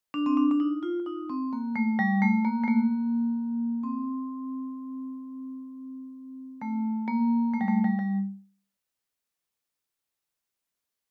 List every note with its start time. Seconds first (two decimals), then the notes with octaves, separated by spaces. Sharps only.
0.14 D4
0.26 C4
0.37 D4
0.51 D4
0.60 D#4
0.83 F4
1.00 F4
1.06 D#4
1.29 C4
1.53 A#3
1.76 A3
1.99 G3
2.22 A3
2.45 A#3
2.64 A3
2.68 A#3
3.83 C4
6.61 A3
7.08 A#3
7.54 A3
7.61 G3
7.68 A3
7.84 G3
7.99 G3